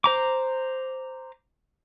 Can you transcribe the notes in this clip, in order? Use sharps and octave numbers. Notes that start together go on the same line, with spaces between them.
C5 A#5 D6